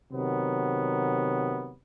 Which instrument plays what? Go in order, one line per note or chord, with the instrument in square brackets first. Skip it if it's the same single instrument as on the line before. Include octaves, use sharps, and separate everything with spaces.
[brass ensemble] C3 D#3 F#3 B3